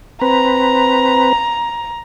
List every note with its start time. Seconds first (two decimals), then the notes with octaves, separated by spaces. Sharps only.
0.22 C4 B4 A#5